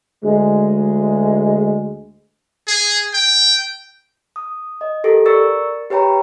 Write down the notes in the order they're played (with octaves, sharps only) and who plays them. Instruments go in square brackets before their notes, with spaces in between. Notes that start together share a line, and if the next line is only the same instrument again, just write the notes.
[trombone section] D2 G#3
[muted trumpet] G#4
G5
[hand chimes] D#6
D#5
G4 A4 A#4
A#4 D5 C#6 E6 A6 C#7
G4 B4 C#5 G5 A#5 B5